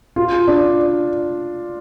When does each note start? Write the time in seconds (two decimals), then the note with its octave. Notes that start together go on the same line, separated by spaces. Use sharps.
0.16 F4
0.48 D4